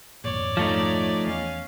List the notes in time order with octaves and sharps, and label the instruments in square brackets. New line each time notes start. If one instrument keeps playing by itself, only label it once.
[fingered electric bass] G#1 F2 A#2 [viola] C#5 D5
[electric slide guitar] F3 A3 D#4
[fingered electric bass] E2 [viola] C#4 F5